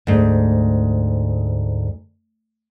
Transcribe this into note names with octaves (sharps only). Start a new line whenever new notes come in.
D2 G#2